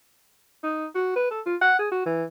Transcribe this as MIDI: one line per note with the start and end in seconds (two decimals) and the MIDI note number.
0.64 0.86 63
0.95 1.13 66
1.16 1.29 71
1.31 1.41 69
1.46 1.56 65
1.62 1.77 78
1.79 1.89 68
1.92 2.02 66
2.06 2.24 52